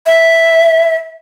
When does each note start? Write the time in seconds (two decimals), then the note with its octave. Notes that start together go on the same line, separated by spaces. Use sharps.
0.06 E5